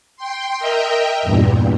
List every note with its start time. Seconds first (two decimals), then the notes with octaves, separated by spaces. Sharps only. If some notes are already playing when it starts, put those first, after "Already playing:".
0.17 G5 C6
0.59 A#4 D#5 E5 G5 A#5
1.22 E2 G2 A#2